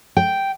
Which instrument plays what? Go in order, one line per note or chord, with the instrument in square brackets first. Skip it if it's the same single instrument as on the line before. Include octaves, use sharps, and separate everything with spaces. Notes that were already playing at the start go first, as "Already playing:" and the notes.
[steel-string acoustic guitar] G5